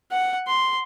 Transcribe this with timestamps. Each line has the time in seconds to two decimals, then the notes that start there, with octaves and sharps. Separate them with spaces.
0.12 F#5
0.47 C6